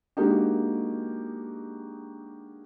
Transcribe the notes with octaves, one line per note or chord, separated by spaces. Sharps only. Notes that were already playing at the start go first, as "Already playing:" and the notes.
G#3 A#3 D4 D#4 F#4 G4